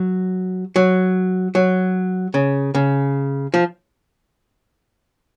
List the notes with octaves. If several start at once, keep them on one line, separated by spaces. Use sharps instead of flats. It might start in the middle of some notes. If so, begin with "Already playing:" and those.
Already playing: F#3
F#3
F#3
C#3
C#3
F3